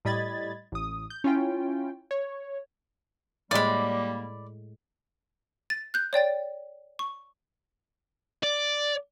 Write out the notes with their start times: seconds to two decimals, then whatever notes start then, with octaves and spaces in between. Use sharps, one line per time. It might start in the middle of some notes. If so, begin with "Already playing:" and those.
0.05 A2 G3 D#5 B5 G#6 A6
0.72 A1 D#6
1.10 G6
1.24 C#4 E4 F4 G5
2.11 C#5
3.51 A2 G3 G#3 A#3 D5 B5
5.70 A6
5.94 F#6 G6
6.13 C#5 D5 G5 A6
6.99 C#6
8.43 D5